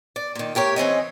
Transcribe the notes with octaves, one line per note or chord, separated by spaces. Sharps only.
D5
A#2 D#3
A2 G4 A#4 C#5
E3 C4 C#4 D#5